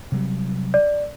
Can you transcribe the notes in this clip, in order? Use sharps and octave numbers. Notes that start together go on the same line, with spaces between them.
C3 F#3 G3
D5